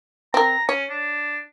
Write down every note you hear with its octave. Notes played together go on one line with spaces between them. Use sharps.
C4 A#4 A#5
C#4 C#5
D4